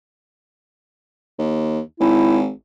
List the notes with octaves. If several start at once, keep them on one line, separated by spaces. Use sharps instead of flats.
D#2
G#1 E4